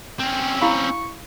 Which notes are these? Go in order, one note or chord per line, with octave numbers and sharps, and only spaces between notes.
C4 C#4 G5
E4 F5 B5 C#6